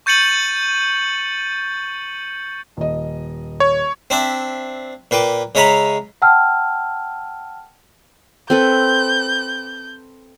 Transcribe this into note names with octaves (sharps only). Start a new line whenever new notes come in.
C#6 G6 A6 C#7 D#7 F#7
D#1 D#5
C#5
C4 D4 E5
A#2 B4 G5 D6
C#3 G#3 C#5 E5 A#5 B5
F#5 G5 A5 E6 F6
C4 A4 B4 G6